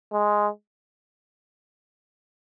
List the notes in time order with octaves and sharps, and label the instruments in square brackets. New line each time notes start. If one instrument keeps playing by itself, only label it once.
[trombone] G#3